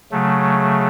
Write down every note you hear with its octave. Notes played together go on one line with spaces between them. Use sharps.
C#3 F#3 A3